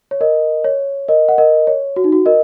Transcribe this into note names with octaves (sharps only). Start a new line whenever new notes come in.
C#5
A#4 D#5
C#5
A#4 D#5
F#5
A#4 D#5
C#5
F#4
D#4
F#4
A#4 D#5